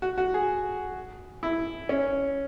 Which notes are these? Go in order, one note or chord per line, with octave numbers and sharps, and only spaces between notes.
F#4
F#4
G#4
E4
C#4